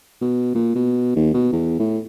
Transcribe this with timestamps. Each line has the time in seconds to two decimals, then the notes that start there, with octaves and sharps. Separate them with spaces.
0.21 B2
0.55 A#2
0.75 B2
1.16 D#2
1.34 B2
1.53 E2
1.79 A2